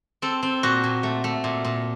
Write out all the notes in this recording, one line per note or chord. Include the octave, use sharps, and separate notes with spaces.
C4 A4
C4
A#2 F#4
A#2
A3
A3
A#2
A#2